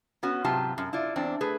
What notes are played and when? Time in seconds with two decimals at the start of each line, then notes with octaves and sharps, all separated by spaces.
0.23 B3 C#4 F#4
0.44 G#2 C3 F#3 F4 G4 A5
0.78 F#2
0.93 E4 F4 D5
1.16 E2 C4 D4
1.41 A3 G#4 B4